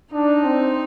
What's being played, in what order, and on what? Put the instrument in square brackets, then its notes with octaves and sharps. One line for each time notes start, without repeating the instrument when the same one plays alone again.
[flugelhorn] D4 [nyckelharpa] D#4
[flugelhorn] C4